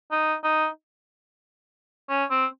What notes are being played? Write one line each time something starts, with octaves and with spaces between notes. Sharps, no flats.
D#4
D#4
C#4
C4